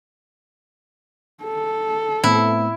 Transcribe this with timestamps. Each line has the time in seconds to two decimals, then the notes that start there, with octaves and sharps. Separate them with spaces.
1.44 A4
2.24 A2 B3 C4 E4